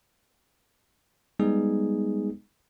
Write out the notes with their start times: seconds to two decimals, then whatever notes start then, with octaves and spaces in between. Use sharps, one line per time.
1.39 G3 G#3 B3 D#4 G#4